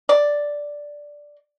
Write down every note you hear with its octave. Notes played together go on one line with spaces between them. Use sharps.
D5